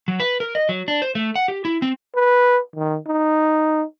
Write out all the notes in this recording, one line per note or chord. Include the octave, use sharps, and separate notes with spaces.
F#3
B4
A#4
D#5
F#3
D4
C5
A3
F#5
G4
E4
C4
B4
D#3
D#4